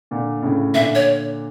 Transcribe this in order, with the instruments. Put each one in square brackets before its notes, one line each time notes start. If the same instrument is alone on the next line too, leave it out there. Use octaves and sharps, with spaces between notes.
[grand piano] A#2 D3
A2 C#3
[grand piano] A#2 D3 [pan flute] E5
[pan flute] C#5